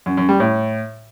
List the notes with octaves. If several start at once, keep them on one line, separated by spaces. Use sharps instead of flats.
F#2
F#2
G3
A2